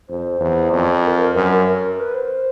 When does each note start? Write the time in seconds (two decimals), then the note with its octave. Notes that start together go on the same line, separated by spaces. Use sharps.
0.09 F2 C5
0.41 E2
0.73 F2
1.04 A#4
1.20 A#4
1.36 F#2 A#4
1.52 A#4
1.68 A#4
1.99 B4
2.14 C5